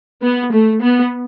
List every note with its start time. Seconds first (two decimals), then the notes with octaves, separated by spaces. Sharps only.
0.22 B3
0.52 A3
0.81 B3